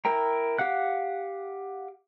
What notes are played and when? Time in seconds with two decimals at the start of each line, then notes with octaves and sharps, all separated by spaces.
0.05 E4 A#4 G5 A#5
0.59 G4 F5 F#5 F#6